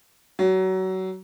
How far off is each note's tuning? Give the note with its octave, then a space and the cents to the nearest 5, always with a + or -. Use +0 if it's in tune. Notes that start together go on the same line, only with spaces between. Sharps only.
F#3 +25